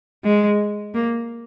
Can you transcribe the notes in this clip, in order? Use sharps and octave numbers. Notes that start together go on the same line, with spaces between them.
G#3
A#3